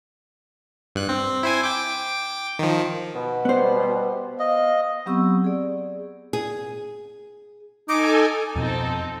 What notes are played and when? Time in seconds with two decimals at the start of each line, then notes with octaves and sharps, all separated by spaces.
0.95 G2 F#6
1.09 C4
1.43 E4 C5 G#5
1.63 G5 D6
2.59 D#3 F3
3.15 B2
3.45 G3 B3 C5
4.39 D#5 F5
5.06 F#3 B3 C4 G4 C#6 E6
5.44 G#4 D5
6.33 G#4
7.89 D#4 A4 G#5 D6
8.56 F2 B2 C4 D#4 A4